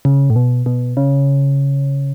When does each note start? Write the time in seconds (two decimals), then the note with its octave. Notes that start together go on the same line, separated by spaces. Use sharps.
0.05 C#3
0.30 A2
0.36 B2
0.66 B2
0.97 C#3